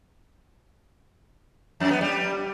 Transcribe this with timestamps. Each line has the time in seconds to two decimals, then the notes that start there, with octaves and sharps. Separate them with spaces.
1.80 F2
1.91 B3
2.01 G3